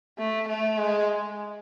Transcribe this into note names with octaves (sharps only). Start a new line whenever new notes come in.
A3
A3
G#3